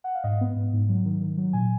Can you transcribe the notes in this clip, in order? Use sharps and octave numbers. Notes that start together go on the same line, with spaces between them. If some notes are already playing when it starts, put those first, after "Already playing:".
F#5
F5
G#2 D#5
B3
G#2
G#2
F#3
D#3
D#3
F#3
A#2 G#5